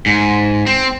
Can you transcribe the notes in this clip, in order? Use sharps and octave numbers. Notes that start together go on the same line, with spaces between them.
G#2
C4